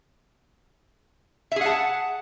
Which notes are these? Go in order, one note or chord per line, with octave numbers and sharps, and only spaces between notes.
G#4 E5 F#5 A5